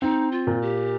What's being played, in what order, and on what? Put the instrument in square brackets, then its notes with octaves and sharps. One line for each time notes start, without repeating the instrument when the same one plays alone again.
[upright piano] C4 [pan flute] D#4
[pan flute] F4
[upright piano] A#2
[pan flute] G4